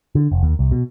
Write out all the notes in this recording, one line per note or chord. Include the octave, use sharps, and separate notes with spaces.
D3
F1
D#2
C2
B2